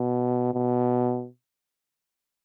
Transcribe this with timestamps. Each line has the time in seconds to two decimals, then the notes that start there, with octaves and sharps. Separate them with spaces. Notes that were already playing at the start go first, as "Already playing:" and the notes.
Already playing: B2
0.54 B2